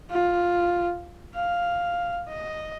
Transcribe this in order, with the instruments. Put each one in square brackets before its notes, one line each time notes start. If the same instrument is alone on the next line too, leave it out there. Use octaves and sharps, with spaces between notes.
[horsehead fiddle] F4
F5
D#5